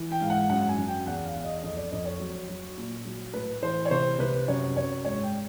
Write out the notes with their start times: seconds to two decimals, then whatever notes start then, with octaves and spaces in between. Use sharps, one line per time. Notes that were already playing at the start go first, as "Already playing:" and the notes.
Already playing: E3
0.12 G5
0.20 G#2 F5
0.30 F#5
0.50 F#2 F#5
0.69 G#5
0.78 F#2
0.88 G5
1.06 E2 F#5
1.25 F5
1.35 E2
1.44 D#5
1.63 F2 D#5
1.77 D5
1.91 F2 D#5
2.05 C#5
2.20 F#3
2.49 F#3
2.77 A#2
3.05 F#3
3.34 A2 B4
3.63 E3 C5
3.85 C#5
3.91 C3 C5
4.19 C3 B4
4.48 F#2 C#5
4.76 F#2 C#5
5.05 G#2 C#5
5.23 G5